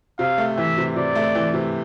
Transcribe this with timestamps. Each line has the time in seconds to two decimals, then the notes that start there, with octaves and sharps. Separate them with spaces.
0.19 C3 F5
0.38 A3
0.58 E3 E5
0.78 C3
0.96 C3 D5
1.15 A3
1.35 E3
1.54 C3